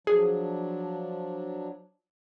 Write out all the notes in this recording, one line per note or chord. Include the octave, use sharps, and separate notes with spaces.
F3 F#3 D4 G#4